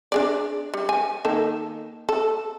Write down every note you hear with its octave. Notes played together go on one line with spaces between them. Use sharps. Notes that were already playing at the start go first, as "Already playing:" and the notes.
D4 G#4 D5
G3
G#5
D#3 A#3 A4
A4